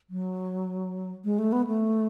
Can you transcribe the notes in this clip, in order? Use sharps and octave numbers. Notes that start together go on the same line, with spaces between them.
F#3
G#3
A3
B3
A3